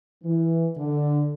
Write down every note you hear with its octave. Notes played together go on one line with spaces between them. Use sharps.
E3
D3